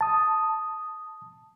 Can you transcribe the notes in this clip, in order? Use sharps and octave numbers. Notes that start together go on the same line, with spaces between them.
A5 D#6